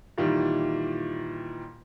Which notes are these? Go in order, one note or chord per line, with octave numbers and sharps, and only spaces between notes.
A#2 D#3 E3 G3